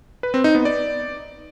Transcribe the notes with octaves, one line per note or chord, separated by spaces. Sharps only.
B4
C4
D#4
B3
D5